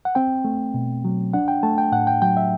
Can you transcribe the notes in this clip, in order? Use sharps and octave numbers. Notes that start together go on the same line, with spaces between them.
F#5
C4 G5
A3
B2
F#3
D4 F#5
G5
A3 A5
G5
A2 F#5
G5
F#3 G5
E5